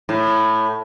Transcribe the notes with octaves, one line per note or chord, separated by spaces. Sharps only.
A2